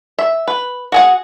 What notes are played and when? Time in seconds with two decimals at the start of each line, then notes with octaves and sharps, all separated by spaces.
0.19 E5
0.48 B4
0.92 F#4 G#4 F#5